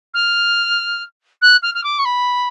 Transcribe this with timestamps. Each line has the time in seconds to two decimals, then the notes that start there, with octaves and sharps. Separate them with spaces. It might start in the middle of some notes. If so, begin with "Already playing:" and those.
0.14 F6
1.41 F#6
1.62 F6
1.74 F6
1.83 D6
1.98 C#6
2.05 B5